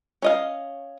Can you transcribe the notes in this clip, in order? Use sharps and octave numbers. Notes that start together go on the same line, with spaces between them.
C#4 D#5 F5